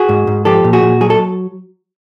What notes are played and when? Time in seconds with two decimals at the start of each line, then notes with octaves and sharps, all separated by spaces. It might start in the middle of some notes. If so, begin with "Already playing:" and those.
Already playing: F#4 G#4
0.09 G#2
0.27 G#2
0.45 F3 G4 A4
0.64 A#2
0.73 F#4 G#4
0.83 A#2
1.01 F#3 G#4
1.10 A4